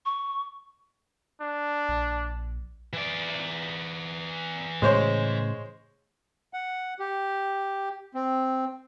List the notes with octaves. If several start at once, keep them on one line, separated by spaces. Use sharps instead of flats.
C#6
D4
A#1
E3 D5
A2 C#3 G#3 C5 C#5
F#5
G4
C4